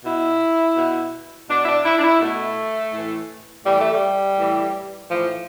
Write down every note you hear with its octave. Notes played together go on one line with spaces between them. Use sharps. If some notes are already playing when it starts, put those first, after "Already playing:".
B2 E4
B2
B2 D4
E4
D4
E4
D4
E4
B2 A3
A2 E3
A2 E3 G3
A3
G3
A2 E3
A2 E3 F3